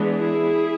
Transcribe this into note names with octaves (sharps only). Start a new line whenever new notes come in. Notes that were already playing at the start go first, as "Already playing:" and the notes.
Already playing: E3 G#3 B3 D4
E4 G#4